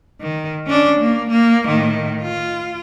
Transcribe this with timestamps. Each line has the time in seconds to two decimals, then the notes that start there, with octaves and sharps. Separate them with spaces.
0.21 D#3
0.67 C#4 D4
1.00 A#3
1.30 A#3
1.67 A2 D#3
2.22 F4